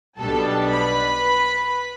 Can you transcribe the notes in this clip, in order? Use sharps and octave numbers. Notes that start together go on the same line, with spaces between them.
B1 B2 G3 B3 D4 A4 A5
B4 B5